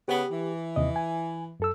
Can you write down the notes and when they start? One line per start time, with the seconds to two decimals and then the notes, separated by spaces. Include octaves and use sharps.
0.08 C#3 B3 G4
0.31 E3
0.76 D#2 C3 D#5
0.96 G#5
1.60 F#2 A4 E6